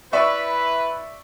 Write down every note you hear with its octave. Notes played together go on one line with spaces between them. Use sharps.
E4 B4 D5 E5 C#6